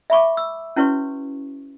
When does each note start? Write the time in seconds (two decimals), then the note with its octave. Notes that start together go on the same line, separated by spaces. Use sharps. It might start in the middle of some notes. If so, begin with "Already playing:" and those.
0.10 E5 B5 C#6 D6
0.37 E6
0.76 C#4 E4 F#4 B4 C#5 C#6